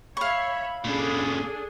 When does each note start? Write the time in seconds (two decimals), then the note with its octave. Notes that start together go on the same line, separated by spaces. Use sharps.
0.17 C#5 E5 F5 B5 C#6
0.84 A#2 C#3 D4 G#4 A4